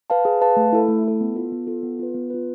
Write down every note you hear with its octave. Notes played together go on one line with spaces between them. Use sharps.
B4 F5 A5
G#4
B4 F5 A5
A3
E4 A4
A3
E4 A4
B3
F4 A4
B3
F4 A4
B3
F4 B4
B3
F4 B4